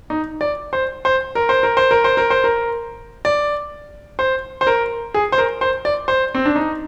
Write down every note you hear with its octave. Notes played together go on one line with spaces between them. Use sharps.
D#4
D5
C5
C5
A#4
C5
A#4
C5
A#4
C5
A#4
C5
A#4
D5
C5
C5
A#4
G#4
C5
A#4
C5
D5
C5
C4
D4
D#4